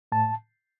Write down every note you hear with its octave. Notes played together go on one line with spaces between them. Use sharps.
A2 A5